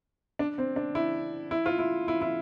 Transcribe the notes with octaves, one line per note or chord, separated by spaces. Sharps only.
D4
C4
D4
E4
E4
F4
E4
E4
E4